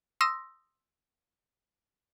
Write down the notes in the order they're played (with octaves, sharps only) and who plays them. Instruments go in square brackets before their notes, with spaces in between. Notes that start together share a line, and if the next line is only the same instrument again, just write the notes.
[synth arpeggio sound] C6 D#6 E6 A#6